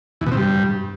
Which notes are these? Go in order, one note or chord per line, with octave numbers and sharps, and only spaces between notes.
E2
B2
C3
G2